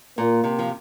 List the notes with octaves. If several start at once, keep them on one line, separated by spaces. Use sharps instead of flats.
A#2 A#3
C3
F3